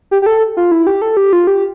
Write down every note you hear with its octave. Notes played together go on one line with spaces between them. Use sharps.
G4
G4
A4
F4
E4
G4
A4
G4
F4
G4